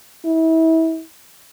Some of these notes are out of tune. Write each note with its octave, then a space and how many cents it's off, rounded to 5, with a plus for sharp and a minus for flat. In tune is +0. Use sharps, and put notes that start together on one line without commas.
E4 -30